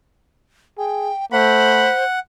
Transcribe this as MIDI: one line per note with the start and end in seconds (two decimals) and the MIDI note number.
0.78 1.11 68
0.78 1.25 79
1.32 1.89 57
1.32 2.05 72
1.32 2.19 78
1.32 1.93 83